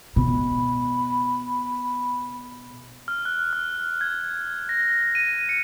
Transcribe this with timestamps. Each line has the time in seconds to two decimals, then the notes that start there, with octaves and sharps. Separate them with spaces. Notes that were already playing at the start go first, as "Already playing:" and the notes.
0.16 B2 B5
3.08 F6
3.25 F#6
3.53 F6
4.01 G#6
4.69 A#6
5.15 D#7
5.49 C#7